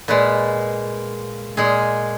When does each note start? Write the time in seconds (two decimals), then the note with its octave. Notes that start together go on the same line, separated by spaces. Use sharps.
0.08 A#2 G#3 B4
1.57 A#2 G#3 G#4